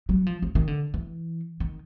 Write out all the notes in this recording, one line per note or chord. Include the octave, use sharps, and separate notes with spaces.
F#3
F3
F3
D#3
D3
E3
D#3